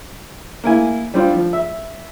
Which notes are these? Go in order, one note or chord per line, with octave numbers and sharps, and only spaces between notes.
A#3 E4 G#5
G3 C4 D4 F4
F3
E5